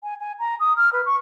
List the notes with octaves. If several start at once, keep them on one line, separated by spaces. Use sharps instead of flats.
G#5
G#5
A#5
D#6
F6
B4
C#6